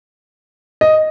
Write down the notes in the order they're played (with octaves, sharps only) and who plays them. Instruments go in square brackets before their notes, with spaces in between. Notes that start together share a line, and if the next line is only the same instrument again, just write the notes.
[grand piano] D#5